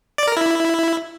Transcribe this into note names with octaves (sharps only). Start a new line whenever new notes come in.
D5
A#4
E4